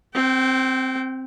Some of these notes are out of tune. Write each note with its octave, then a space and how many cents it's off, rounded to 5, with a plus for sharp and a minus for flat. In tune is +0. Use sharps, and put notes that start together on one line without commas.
C4 +0 G5 -35